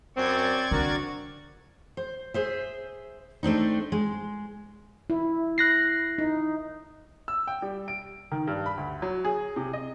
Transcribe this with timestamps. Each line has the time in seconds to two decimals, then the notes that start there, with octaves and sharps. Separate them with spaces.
0.17 F#2 C4 D5 C#6 G#6
0.71 D3 F#4 A#4
1.97 C5
2.34 G#4 C5 E5
3.43 A3 C4 D4 D#4
3.92 G#3
5.10 E4
5.58 F#6 A#6 C7
6.18 D#4
7.28 E6
7.47 G5
7.62 G3
7.88 D7
8.32 D#3
8.47 G2
8.66 B5
8.77 D2
9.02 F#3
9.25 G#4
9.56 C3
9.73 D#5